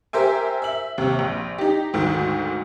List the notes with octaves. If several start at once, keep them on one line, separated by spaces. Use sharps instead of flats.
G4 A#4 C5 E5 G#5
E5 F#7
D#2 C3
A#1
D#4 G4
D2 G#2 D#3